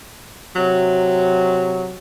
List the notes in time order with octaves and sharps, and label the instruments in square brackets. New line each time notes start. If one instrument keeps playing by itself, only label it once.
[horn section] C3 F#3